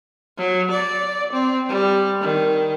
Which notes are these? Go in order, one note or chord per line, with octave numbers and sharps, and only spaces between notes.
F#3
D5
C4
G3
D#3